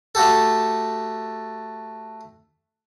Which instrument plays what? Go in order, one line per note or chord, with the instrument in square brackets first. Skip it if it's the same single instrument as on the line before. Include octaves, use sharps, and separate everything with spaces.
[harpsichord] A3 F#4 G4 A4